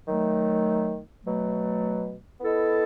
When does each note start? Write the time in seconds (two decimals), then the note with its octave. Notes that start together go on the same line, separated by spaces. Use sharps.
0.08 D#3 F#3 A3
1.24 B2 F#3 A3
2.40 B3 E4 A4 D#5